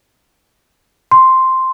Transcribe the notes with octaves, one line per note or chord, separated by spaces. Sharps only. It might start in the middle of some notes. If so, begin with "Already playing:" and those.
C6